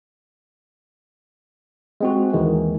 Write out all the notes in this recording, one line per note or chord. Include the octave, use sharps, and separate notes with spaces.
G#3 C4 F#4
D#2 D#3 E3 G#3